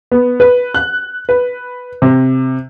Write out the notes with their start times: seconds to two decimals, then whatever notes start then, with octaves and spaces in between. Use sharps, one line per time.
0.12 B3
0.40 B4
0.74 F#6
1.29 B4
2.02 C3